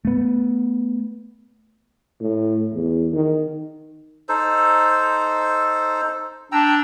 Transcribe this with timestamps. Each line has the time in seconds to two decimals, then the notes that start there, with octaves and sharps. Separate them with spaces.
0.05 A3 B3
2.21 A2
2.74 E2
3.13 D#3
4.29 D#4 A4 C5
6.52 D4 G5 A#5 E6